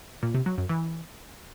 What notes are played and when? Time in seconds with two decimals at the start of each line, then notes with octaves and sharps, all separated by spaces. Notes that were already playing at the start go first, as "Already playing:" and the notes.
0.23 A#2
0.34 C3
0.46 F#3
0.58 F#2
0.69 E3